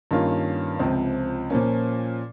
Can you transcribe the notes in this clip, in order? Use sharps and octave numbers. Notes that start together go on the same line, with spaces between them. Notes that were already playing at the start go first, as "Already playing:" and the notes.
G2 D#3 A#3 C#4 F4
C#2 C3 F3 C4
A#2 F3 A#3 C#4